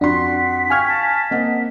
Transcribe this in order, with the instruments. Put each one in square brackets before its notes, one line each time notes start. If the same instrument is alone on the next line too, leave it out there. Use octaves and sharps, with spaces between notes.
[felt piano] F2 F#4 C6 [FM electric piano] D4 [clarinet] F#5 [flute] B6
[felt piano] F5 G5 C#6 [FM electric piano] G#5 F6 G#6
[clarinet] A5
[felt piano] A#3 C4 F#5 [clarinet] D#5